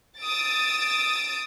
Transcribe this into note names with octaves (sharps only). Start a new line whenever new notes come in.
D#6 E6 A6 D7